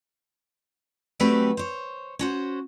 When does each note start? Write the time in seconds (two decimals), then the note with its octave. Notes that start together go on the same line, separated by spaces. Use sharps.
1.20 F#3 G3 A3 C4 G4 B4
1.57 C5 C#5
2.19 C#4 F#4 C5